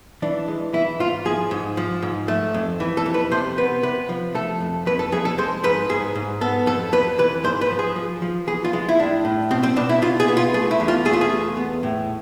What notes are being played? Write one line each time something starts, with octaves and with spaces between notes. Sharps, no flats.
E3 D4
G#3
E3 E4
G#2 F4
F3 G#4
G#2
F3
G#2
A3
F2
E3
A4
F2
B4
C3 C5
B3 B4
C3 B4
F3
A3 A4
F2
F2 B4
A4
F2 G#4
A4
G#3 C5
G#2 B4
G#2 G#4
G#2
B3 A4
F2 A4
F2 B4
E3 B4
G#2 C5
B4
F3
G#4
F3
F3
E3 G#4
F4
G#3
E4
A2 D4
A2
B2 C4
C4
B2 D4
E4
B2 F4
G#4
B3
F4
A3 G#4
E4
E2
F4
A3 G#4
F4
G#4
E2
B3
A2